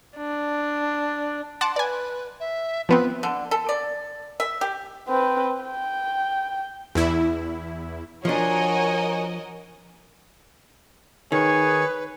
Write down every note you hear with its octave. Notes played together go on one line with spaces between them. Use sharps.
D4
F#5 A5 C6 D6
B4 D5 G#5
E5
F3 B3 C4 B4
D3
A4
D5
E5
G4
C4 B4
G5
E2 E4
F3 D4 F#4 A#4 C#5 D#5 G#5
D#3 G#4 B4 C#5